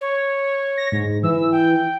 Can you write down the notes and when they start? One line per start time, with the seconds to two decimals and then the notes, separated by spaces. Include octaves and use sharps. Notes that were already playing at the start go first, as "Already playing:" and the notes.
0.01 C#5
0.77 A#6
0.92 G#2
1.23 E3 E6
1.52 G5